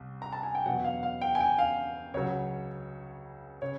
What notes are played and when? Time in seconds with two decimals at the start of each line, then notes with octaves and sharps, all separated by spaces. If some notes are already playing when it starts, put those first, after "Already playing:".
Already playing: C2 C3
0.22 A#5
0.33 A5
0.43 G#5
0.55 G5
0.66 E2 B2 F#3 F#5
0.84 F5
1.03 F5
1.21 G5
1.35 G#5
1.40 G5
1.58 F5
2.14 C#2 C#3 F#3 C#5
3.62 C#3 C#5